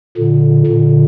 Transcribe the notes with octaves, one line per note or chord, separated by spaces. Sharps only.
A#2 D3
A#2 D3